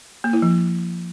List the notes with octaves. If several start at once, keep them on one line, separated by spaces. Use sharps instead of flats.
A#3
E4
F3